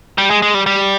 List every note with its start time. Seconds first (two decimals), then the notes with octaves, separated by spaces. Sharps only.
0.18 G3
0.30 G#3
0.42 G#3
0.54 G3
0.66 G3